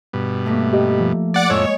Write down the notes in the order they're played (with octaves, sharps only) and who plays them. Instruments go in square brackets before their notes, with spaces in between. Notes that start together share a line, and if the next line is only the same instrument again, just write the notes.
[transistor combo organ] G2 B2
[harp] A3 A#3
[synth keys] G4 D#5
F3
[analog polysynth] D5 F#5 D6
[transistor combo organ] F2 A2 E6 [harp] G#3 [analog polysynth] C#5